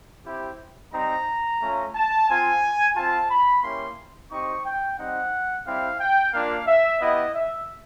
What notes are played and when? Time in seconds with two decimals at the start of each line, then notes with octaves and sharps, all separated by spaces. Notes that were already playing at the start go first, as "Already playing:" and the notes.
0.26 C4 E4 G4
0.93 G3 C4 D#4 A#5
1.61 A3 C#4 F4
1.95 A5
2.29 C4 F4 G#5
2.96 C4 F4 A5
3.30 B5
3.63 A#3 C#4 E4 G4 C6
4.31 C4 D#4 G4 C#6
4.65 G5
4.98 G3 C4 D#4 F#5
5.66 G3 C4 E4 G4 F5
6.00 G5
6.33 A#3 D4 F4 F5
6.67 E5
7.00 B3 E4 G4 D#5
7.35 E5